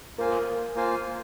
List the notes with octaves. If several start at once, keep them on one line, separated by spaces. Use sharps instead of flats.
A#3 F4 A#4 C5 F5 G#5
A#3 F4 C5 F5 G#5